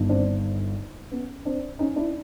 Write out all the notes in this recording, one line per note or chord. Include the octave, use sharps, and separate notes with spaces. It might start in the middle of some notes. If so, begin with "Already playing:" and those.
Already playing: G1 G2 D#3
C4 D4
B3 C#4
C4 D4
C#4 D#4
D4 E4